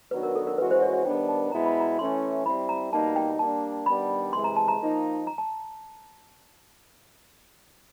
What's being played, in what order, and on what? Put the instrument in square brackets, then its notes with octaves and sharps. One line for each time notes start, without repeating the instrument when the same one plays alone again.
[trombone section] D#3 F#3 B3 D4 F#4 [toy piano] B4
[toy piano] A#4
A4
A#4
[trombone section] E3 G#3 C#4 F#4 [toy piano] B4
[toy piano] C5
C#5
C#5
[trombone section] D#3 G3 B3 D4 [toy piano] G5
[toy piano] A5
[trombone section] B2 G#3 B3 E4 [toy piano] A#5
[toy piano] B5
A#5
[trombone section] E3 A3 C#4 E4 [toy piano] C6
[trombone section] G3 C4 E4 [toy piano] B5
[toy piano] A#5
[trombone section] B2 G3 A#3 D#4 [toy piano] A5
[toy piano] G5
[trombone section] G3 A#3 D4 [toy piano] A5
[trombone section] D#3 G3 B3 D4 [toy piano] B5
[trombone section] C3 E3 G#3 [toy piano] C6
[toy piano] A#5
A5
A#5
[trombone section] F3 A#3 D#4
[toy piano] A#5
A5